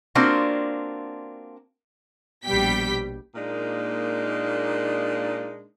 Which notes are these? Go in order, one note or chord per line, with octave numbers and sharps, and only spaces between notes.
A#3 C4 D4 F4 F#4
A#1 B2 G3 G5 B6
A#2 G#3 A#3 D4 D#4